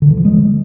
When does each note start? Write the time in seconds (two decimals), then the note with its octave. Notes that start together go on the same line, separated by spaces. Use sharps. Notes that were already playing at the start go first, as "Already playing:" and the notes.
0.02 D3
0.10 E3
0.17 F3
0.25 G#3